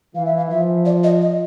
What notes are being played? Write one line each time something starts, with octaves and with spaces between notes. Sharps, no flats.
E3 F5
E5
F5
F3 E5
D5
D#5
D#5